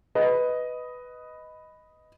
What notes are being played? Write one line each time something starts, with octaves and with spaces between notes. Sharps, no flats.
B4 D#5